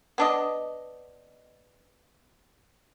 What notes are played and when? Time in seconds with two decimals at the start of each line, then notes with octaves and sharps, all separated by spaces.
0.18 B3 D4 D#5